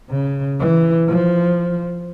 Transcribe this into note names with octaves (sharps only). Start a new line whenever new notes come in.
C#3
E3
F3